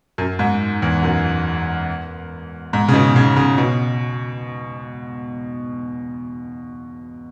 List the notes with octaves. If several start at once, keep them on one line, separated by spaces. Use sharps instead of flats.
F#2
G#2
E2
F#2
G#2
C#3
B2
C#3
C#3
B2